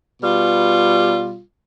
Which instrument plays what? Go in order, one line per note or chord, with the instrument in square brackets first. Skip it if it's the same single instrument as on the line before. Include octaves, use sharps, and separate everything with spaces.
[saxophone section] B2 G3 F4